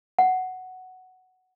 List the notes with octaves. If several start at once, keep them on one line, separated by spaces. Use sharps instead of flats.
F#5